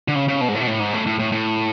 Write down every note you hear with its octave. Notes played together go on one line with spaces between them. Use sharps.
D3
C#3
C#3
B2
G#2
A2
B2
A2
G#2
A2
A2
A2
A2